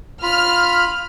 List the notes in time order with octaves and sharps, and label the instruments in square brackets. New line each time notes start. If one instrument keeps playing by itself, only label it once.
[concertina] F4 B5 [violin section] F6